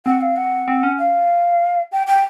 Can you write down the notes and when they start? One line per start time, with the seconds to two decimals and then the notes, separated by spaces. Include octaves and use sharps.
0.05 C4 F#5
0.21 F5
0.36 F#5
0.68 C4
0.83 C#4
0.98 F5
1.92 G5
2.07 G5